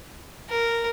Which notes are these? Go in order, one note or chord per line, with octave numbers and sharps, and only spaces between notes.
A#4